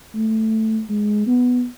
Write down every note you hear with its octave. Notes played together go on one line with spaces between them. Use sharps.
A3
G#3
B3